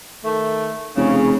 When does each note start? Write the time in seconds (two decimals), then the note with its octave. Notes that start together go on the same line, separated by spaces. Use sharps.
0.24 D#3 A3
0.97 F1 C#3